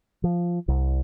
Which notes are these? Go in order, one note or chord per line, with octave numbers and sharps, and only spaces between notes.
F3
C2